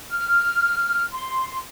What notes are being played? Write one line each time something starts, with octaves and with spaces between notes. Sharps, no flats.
F6
C6